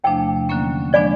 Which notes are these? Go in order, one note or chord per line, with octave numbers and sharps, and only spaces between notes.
E2 C3 F3 A3 D4 G5
D3 F#3 A#3 C#4
F3 G#3 B3 D4 D5